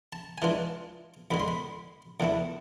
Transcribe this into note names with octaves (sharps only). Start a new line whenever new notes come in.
A5
G#5
E3 G#3 D4 F4 A5
E2 D3 G#3 B5
C6
B5
E2 D3 A3 E4